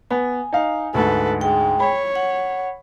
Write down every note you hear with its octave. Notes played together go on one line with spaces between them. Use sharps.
B3 G#5
D#4 F5
D2 G#2 A4 B4
G#3 G5
C#5 B5
F#5